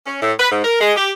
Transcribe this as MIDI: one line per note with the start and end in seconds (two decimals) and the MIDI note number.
0.07 0.20 61
0.22 0.32 45
0.39 0.50 71
0.52 0.62 44
0.64 0.78 70
0.81 0.92 56
0.97 1.12 67